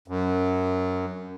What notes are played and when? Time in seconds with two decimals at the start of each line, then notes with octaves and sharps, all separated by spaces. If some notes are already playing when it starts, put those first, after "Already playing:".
0.08 F#2